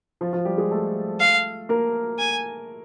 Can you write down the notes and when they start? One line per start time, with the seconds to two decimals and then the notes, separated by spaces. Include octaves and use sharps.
0.21 F3 F4
0.33 F3 F4
0.45 G3 G4
0.58 G#3 G#4
0.71 A3 A4
1.20 F5
1.69 A#3 A#4
2.18 G#5